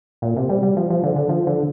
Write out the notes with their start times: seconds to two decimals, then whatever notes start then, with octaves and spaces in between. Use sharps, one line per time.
0.22 A#2
0.37 C3
0.49 G3
0.63 G3
0.77 F3
0.90 F3
1.04 D3
1.16 D3
1.29 F3
1.47 D3